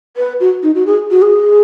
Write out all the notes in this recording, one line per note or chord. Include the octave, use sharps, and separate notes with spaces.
B4
F#4
D#4
F#4
G#4
F#4
G#4